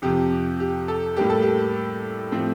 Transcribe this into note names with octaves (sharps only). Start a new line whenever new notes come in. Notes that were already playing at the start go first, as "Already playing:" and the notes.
F2 C3 F3 G4
G4
A4
A2 G3 A#3 G4
A4
G4
A2 F3 A3 C4